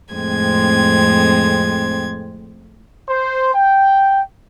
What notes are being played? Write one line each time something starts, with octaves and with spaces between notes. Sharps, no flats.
F2 A2 G#3 C4 G#6
C5
G5